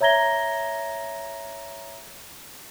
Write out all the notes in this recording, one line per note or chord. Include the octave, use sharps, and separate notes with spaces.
C#5 E5 A#5 G#6 A#6 G7